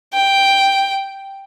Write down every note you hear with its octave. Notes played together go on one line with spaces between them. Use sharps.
G5